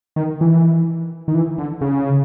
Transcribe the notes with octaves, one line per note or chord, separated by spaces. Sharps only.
D#3
E3
D#3
E3
D3
C#3